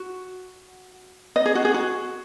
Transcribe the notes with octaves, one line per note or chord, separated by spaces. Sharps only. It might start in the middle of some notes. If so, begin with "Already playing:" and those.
Already playing: F#4
D#5
G#4
F#4
G#4
F#4